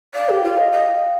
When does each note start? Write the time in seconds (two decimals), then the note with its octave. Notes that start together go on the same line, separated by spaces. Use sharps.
0.14 D5 F5
0.29 G4 G5
0.43 F4
0.53 D#5 F5
0.72 D#5